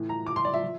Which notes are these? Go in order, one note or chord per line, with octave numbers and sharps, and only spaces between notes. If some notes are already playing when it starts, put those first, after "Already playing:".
Already playing: A2 E3
A#5
D6
C6
D5
E5
F3